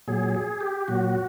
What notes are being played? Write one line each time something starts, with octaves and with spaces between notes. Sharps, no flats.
A#2 F#3 G#4
G#4
G4
A#2 F#3 F#4